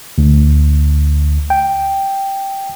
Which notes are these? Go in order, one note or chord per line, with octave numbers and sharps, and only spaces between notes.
D2
G5